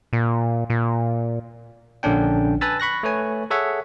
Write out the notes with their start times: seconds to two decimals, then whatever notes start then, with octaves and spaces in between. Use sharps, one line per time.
0.13 A#2
0.70 A#2
2.03 A#1 D3 C#4 D4 G5
2.61 B4 G#5 A5 B5 E6 A6
2.80 B5 C#6 F#6 A#6
3.03 A3 B4 C#5 G#5
3.50 G#4 A4 C#5 E5 F#5